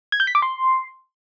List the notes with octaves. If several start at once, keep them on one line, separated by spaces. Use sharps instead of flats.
G#6
G6
B6
D6
C6